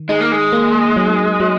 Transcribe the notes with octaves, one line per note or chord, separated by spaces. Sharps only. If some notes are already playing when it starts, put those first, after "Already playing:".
Already playing: D#3
G#3 D#4
A#3
G#3
A#3
F#3
F#3